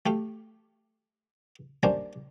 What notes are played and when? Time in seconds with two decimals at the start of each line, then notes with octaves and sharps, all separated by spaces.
0.06 A3 G4 F5
1.83 G3 A#3 C#4 D4 C5